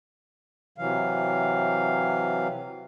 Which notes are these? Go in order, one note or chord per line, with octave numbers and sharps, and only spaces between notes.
C3 E3 F#3 F5